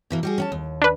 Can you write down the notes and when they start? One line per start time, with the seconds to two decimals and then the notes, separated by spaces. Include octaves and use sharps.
0.10 B2 E3 A#3
0.23 G3 F#4 G#4
0.38 C#4 F#5 A5
0.52 D#2
0.82 D4 B4